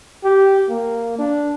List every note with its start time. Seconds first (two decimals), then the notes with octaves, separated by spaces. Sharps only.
0.24 G4
0.69 A#3
1.18 D4